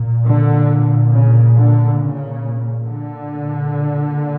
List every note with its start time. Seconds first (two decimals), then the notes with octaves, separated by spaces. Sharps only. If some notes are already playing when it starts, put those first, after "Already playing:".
Already playing: A#2
0.26 D3
1.12 C#3
1.56 D3
2.00 C#3
2.86 A#2 D3